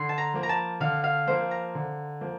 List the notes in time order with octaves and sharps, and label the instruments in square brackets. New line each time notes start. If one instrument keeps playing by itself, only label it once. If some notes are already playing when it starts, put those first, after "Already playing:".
Already playing: [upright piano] D3 [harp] C6
[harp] A5
A#5
[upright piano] F3 A#3
[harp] A#5
A5
[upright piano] D3 [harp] F5
[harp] F5
[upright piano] F3 A#3 [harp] C5
[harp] A#5
[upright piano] D3
F3 A#3